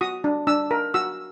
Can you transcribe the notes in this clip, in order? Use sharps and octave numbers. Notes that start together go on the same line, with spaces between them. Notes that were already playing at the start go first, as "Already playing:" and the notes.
F#4 D#6
D4
D4 E6
A#4
F#4 E6